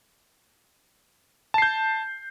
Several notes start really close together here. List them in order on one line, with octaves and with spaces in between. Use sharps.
A5 C7 G6